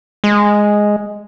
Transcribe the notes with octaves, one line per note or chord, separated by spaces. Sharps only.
G#3